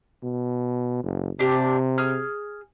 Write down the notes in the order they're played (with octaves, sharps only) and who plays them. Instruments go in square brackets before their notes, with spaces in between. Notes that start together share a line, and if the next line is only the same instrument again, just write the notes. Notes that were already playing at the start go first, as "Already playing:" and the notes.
[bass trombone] B2
F#1
[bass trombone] C3 [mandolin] D4 G4
[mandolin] G#4 F6